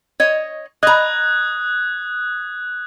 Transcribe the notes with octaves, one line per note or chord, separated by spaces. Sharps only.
C#5 D#5
D#5 A#5 D#6 F#6 G#6